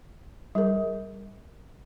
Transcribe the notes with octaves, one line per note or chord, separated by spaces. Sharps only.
G3 G#4 A#4